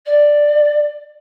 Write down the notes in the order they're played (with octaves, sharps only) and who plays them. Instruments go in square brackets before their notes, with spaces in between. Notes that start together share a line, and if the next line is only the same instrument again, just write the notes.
[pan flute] D5